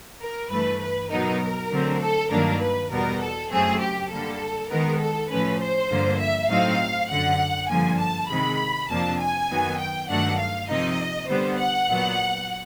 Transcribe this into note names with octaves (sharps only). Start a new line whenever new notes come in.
A#4
G2 E3 A3 B4
B4
B2 F#3 B3 D#4 A#4
D3 F#3 A3 C4
A4
G2 D#3 F#3 A#3 D4 A#4
B4
E2 B2 G3 B3 A#4
A4
F#2 C#3 F#3 A3 C4 G#4
G4
D3 G3 A#3 A4
D#3 G#3 B3 A#4
A4
A2 F3 A3 C#4 B4
C5
G2 D3 F3 A#3
E5
A2 F#3 A3 C4 D#4 F5
F#2 D3 F3 F#5
G2 D3 F3 A#3 G#5
A5
C3 D#3 G#3 B5
F2 C3 F3 A#3 D4 A5
G#5
F#2 D#3 F#3 B3
G5
G2 D#3 F#3 A3 D4 F#5
F5
C3 F3 A#3 D#4 D#5
D3 G3 B3 C5
F#5
A#2 F#3 B3